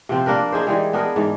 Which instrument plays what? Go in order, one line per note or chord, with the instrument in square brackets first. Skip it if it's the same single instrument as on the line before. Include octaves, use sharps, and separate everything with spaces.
[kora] C3 F3 C4
A#3 D4 A#4 B4
D#4 E4 G#4 C5
E3 G3 G#3
B3 D4 G#4 A#4
G#2 E3